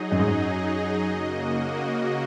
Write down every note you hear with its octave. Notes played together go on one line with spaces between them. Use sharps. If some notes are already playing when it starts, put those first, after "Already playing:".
Already playing: F#3 D#4 G#4 D#5
F#2
G#2
F#2
C#3 A#3 F#4 D#5